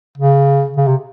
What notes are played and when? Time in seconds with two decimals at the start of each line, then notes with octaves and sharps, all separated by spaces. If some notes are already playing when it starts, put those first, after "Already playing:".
0.17 C#3
0.77 C#3
0.88 C3